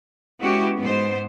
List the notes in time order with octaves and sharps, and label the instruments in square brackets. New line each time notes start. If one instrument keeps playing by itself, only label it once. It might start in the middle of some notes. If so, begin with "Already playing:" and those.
[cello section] G#3 B3 C#4 E4 F#4 G4
G#2 B3 C5